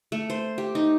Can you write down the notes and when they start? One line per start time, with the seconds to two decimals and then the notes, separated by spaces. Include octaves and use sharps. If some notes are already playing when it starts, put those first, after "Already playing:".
0.12 A3
0.30 C5
0.58 G4
0.75 D#4